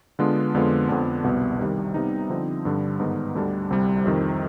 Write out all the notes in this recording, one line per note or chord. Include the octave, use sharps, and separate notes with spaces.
D3 G#3 B3 D4 F4
F2 D3 G#3 B3 F4
F2 D3 F3 B3 D4
C2 B2 B3
C3 D#3 G3
C3 G3 B3 D#4
D3 F3 C4 D#4
G2 D3 G3
G#2 D#3 B3 D#4
D2 D3 G3 D4
C2 C3 G3
F2 C3 D#3